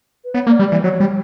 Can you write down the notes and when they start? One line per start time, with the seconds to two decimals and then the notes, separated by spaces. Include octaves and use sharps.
0.25 B4
0.34 B3 C#5
0.47 A#3
0.50 D5
0.59 G3
0.66 D5
0.72 E3
0.84 F#3 C#5
1.00 G3